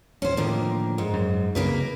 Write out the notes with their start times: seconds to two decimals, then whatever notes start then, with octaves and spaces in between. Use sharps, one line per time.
0.22 D1 C#4 C5
0.37 A2 D3 D#3 F3 A#3
0.98 G#2
1.14 F#2
1.55 C2 G2 C#3 A#3 A#4 B4